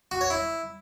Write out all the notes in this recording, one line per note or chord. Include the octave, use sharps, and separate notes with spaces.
F#4
C#5
E4